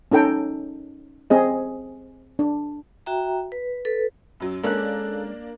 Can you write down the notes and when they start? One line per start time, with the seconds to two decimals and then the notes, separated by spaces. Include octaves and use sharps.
0.12 C#4 D#4 A4 G5 A#5
1.30 C4 G#4 D#5
2.39 D4
3.06 F#4 E5 G5 A#5
3.52 B4
3.85 A4 B4
4.40 F#2 F#3
4.64 G#3 A#3 C#4 D4 A4 A#4 F#6